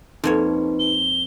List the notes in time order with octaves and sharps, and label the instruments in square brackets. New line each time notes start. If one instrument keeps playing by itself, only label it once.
[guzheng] F2 A#3 C#5 [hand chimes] D#4 B4
[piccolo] G7